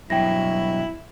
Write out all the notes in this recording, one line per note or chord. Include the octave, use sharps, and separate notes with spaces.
G2 B2 E3 F#3 E4 G5 A#6